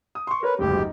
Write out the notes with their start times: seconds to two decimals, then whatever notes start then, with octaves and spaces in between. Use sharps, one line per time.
0.15 D#6
0.27 C6 C#6
0.43 A#4 B4 C#5
0.59 F#1 D2 G#2 G4
0.78 D#4